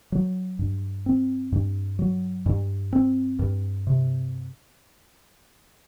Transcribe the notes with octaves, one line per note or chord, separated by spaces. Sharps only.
F#3
G2
C4
G2
F#3
G2
C4
G2
C3